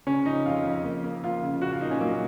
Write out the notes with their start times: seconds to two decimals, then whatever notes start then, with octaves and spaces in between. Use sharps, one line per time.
0.06 C#3 C#4
0.26 F3 D#4
0.46 F2 F4
0.65 F2
0.84 A#3
1.04 A#3
1.23 F3 F4
1.43 C#3
1.62 A#2 F#4
1.72 F4
1.81 A#2 D#4
1.91 C#4
2.00 F#3 A#3